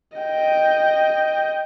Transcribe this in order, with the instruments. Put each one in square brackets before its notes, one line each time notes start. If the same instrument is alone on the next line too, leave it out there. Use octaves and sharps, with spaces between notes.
[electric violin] D#5 G5